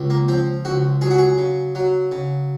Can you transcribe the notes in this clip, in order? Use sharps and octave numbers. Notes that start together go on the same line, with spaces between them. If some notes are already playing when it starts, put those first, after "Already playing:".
Already playing: C#2
A#3
F3 C4
C#2 F#4
F#3 G#4
F#4
G#4
C#3
F#3
C#3